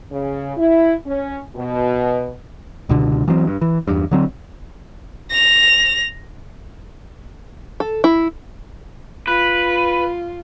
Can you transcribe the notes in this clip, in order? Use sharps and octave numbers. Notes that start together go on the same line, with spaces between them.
C#3
E4
C#4
B2
C#2 B2 D3
E3 F#3 B3 C4
G2
E3
E2 G2
D3 F#3 C4
A#6 F7
A4
E4
F4 B4